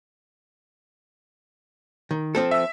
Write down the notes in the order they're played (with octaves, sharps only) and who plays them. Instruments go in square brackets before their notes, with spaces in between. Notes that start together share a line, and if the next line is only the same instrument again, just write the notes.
[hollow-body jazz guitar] D#3
F3 C4 A4
[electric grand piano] E5 E6